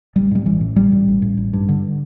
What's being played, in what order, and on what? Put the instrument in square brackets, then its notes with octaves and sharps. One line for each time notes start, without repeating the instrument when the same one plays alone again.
[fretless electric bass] A1 G3
A2 G3
A1 E3
A2
A1 G3
A2
A1
A2
A1
G2
D3